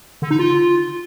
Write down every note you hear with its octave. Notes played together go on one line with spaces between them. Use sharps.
D3
D#4
F4